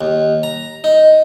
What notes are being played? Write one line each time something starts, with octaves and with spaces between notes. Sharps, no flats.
D#2
A#5
D#4